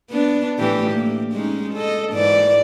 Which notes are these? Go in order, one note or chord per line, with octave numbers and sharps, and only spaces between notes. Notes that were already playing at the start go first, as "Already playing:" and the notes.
B3 D4
A2 E3 G4
A#3
G#3 C#4 D#4
A4 D#5
G#2 E3 D5